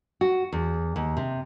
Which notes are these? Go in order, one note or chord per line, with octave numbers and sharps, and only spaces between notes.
F#4
E2
D#2
C3